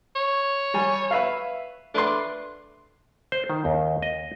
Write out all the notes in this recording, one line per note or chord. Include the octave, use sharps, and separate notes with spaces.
C#5
G3 G#5
B4 E5 F5
A3 D4 B4 C6
C5
D#3
D#2
D#5